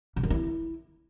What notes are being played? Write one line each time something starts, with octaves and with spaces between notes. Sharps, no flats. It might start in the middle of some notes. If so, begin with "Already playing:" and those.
C#3
D#3
E4